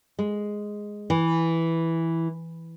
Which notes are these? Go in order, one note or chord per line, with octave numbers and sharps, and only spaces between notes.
G#3
E3